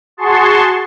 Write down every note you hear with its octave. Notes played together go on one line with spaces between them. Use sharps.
F#4 G#4 A5 C6 C#6